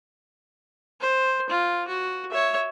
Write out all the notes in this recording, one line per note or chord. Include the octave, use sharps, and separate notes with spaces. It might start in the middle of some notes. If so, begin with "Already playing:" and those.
C5
F4
F#4
C#5 E5